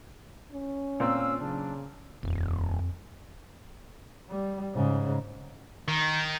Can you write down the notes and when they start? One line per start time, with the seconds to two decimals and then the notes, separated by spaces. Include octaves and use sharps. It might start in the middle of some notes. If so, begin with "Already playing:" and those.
0.53 C#4
1.00 A#2 C4 F4 F5 E6
1.39 C#3 F#3 D4
2.23 D#1 F2
4.30 G3
4.75 G#2 C#3
5.88 D#3